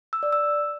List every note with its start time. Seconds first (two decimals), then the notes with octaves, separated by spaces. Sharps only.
0.13 E6
0.23 D5
0.33 E6